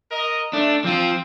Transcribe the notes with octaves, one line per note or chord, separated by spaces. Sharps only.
A#4 D#5
A3 D4
F3 C4 F4